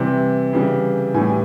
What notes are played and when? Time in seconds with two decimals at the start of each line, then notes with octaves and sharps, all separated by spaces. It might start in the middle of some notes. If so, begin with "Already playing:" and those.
Already playing: C3 E3 G3
0.53 C#3 E3 G3
1.14 A2 E3 G3 G#5